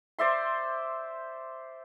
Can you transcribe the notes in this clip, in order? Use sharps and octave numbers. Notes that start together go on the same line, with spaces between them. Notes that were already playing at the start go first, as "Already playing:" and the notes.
C5 D5 E5 C6